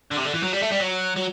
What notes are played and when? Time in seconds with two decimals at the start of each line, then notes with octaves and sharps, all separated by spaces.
0.11 D3
0.16 C3
0.25 D3
0.34 E3
0.43 F#3
0.53 G3
0.62 A3
0.72 G3
0.80 F#3
1.17 F#3